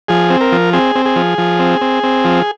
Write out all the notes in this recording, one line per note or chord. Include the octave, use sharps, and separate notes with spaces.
F3 G#4
C4
A#4
F3
C4 G#4
C4
G#4
F3
F3
C4
C4
C4
F3